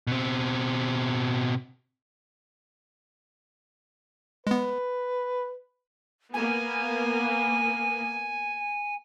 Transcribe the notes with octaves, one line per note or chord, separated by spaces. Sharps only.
B2 C4
G#3 B3 B4
A#3 B3 G#5